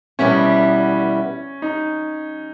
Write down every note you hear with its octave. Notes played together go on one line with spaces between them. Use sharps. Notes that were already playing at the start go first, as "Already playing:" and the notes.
E2 B2 G3 B3 C#4 E4
D#4